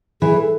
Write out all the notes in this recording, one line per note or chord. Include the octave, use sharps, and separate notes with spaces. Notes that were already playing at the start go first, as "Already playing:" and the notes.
E3 G#4
A4